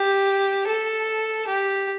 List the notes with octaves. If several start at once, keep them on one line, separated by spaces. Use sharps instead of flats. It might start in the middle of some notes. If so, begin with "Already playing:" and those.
Already playing: G4
A4
G4